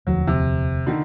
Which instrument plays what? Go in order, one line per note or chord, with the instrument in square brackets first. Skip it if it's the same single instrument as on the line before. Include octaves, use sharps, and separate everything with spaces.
[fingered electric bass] E1 D2 F3 [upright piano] F#3
[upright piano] C3
D3 D#3